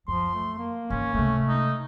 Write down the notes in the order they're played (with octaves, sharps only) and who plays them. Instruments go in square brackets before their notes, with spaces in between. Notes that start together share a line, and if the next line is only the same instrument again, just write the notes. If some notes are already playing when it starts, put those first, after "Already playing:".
[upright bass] F#2 [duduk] F3 [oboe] C6
[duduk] A3
A#3
[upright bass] G#2 D#3 [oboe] C#4
[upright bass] C3 G#3 [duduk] A3
[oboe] D#4